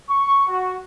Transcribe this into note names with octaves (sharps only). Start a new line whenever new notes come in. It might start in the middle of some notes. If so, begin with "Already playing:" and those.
C#6
F#4